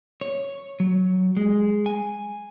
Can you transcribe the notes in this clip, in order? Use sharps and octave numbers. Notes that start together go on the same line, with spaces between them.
C#5
F#3
G#3
G#5